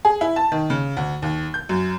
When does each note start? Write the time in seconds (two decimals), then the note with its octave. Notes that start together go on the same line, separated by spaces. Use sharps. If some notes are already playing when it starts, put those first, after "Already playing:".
0.05 G#4
0.21 E4
0.36 A5
0.52 D#3
0.70 C#3
0.97 D2
1.22 D#2
1.54 G6
1.69 F#2